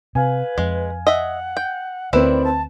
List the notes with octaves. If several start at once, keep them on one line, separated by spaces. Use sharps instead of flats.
C3 B4 F5 G#5
F2 G#3
D#5 E5 F#5
G5
D2 D#3 C4 E4 B4 D5
A5